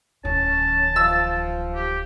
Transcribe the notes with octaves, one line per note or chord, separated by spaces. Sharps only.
D1 D#3 C#4 A5
F3 E6
G4